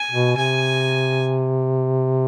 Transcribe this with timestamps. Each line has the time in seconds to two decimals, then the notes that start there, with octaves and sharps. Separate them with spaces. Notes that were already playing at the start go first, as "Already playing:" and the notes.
Already playing: G#5
0.11 B2
0.37 C3 G#5